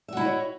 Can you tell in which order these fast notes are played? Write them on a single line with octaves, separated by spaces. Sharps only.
E5 F#4 E4 D#5 C#5